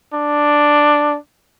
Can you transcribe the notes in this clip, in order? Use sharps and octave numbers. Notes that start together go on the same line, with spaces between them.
D4